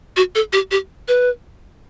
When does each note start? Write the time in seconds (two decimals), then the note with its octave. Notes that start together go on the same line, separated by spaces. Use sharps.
0.17 F#4
0.35 A4
0.53 G4
0.71 G4
1.08 B4